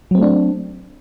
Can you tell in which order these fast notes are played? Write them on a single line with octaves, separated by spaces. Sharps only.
F#3 C4 A3 D4